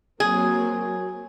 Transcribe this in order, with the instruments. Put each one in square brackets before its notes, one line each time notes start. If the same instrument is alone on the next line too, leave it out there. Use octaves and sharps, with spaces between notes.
[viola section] F#3 A#3 C4 [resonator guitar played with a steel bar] G#4